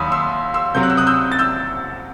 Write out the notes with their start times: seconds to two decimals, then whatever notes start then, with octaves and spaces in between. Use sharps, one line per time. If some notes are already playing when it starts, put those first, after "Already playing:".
Already playing: D#2 D#3 F#3 B5 C6 D#6
0.12 C6 E6
0.54 C6 E6
0.75 C3 F#3 C4 G6
0.83 F#6
0.90 E6
0.97 D#6 F#6
1.07 E6 G6
1.32 A6
1.39 E6 G6